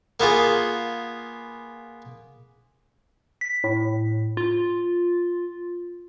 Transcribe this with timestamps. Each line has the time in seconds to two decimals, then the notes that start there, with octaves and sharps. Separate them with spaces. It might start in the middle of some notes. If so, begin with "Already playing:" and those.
0.20 A#3 B3 F4 G#4
3.41 B6
3.64 A2
4.37 F4